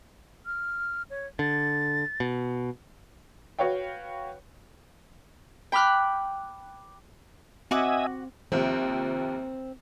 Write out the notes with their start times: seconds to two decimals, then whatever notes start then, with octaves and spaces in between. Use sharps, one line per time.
0.46 F6
1.10 C#5
1.39 D3 A6
2.20 B2
3.59 F#4 B4 C#5 F5 G5
5.72 G5 B5 D6 F6 F#6
7.71 C4 F#4 D#5 E5 F#5 G#5 D6
8.52 D#2 C3 F3 C4